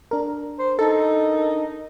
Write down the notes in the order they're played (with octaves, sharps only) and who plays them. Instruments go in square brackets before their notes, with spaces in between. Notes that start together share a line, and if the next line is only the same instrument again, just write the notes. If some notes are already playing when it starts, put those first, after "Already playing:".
[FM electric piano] D4 A#4
[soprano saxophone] C5
[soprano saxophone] D#4 [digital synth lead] A4